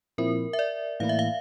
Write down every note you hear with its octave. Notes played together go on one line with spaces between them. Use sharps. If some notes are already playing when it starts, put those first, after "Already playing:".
A#2 F3 C4 E4 A#4
E5
D5
A2 E3 A#3 E4 F5
E5
F5